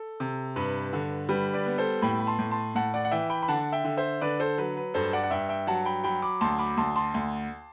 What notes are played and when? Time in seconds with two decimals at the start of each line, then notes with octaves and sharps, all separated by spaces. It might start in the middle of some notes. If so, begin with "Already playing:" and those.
Already playing: A4
0.20 C3
0.56 G2 B4
0.93 D3
1.29 G3 B4
1.53 B4 D5
1.66 B3
1.78 A4 C5
2.02 A2 G5 B5
2.20 B5
2.27 A5 C6
2.39 A2
2.51 A5 C6
2.75 A2 F#5 A5
2.94 D5 F#5
3.05 F#5
3.11 E3 E5 G5
3.30 G5 B5
3.43 B5
3.48 D3 F#5 A5
3.72 E5 G5
3.84 D3
3.97 C5 E5
4.21 D3 B4 D5
4.40 A4 C5
4.58 F#3 B4
4.77 B4
4.94 G2 A4 C5
5.13 D5 F#5
5.24 F#5
5.31 G2 E5 G5
5.49 E5 G5
5.67 F#3 F#5 A5
5.85 G5 B5
6.04 F#3 G5 B5
6.22 B5 D6
6.41 D2 A5 C6
6.59 B5 D6
6.77 D2 A5 C6
6.96 A5 C6
7.14 D2